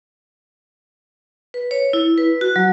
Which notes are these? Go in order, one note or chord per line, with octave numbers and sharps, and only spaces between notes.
B4
C#5
E4
B4
F#4
F#3